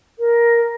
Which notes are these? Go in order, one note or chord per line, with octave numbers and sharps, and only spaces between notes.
A#4